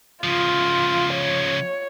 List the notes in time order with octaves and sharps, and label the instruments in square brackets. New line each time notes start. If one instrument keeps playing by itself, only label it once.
[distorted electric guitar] C#3 F3 [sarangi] F4
[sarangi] C#5